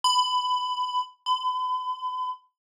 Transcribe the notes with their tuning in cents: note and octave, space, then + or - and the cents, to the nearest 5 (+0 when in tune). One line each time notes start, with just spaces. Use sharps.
B5 +20
B5 +40